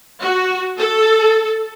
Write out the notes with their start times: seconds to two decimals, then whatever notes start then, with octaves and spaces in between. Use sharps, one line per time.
0.21 F#4
0.76 A4